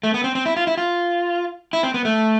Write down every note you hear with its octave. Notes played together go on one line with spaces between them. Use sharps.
A3
B3
C4
C4
E4
F4
E4
F4
E4
C4
B3
A3